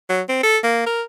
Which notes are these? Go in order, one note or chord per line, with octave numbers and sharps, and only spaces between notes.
F#3
C4
A4
A#3
A#4